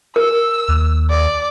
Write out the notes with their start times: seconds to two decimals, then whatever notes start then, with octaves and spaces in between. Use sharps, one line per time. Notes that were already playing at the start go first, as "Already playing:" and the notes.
0.16 A#4 E6
0.68 D#2
1.09 D5